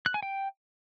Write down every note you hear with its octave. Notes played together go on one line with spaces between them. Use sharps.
F#6
G#5
G5